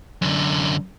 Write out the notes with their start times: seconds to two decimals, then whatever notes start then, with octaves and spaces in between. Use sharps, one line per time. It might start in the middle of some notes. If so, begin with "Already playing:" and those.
0.22 F#2 D3